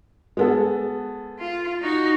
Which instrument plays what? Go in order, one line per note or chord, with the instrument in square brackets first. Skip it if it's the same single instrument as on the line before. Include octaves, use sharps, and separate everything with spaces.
[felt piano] G#3 B3 A4
[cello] F4
D#4 F#4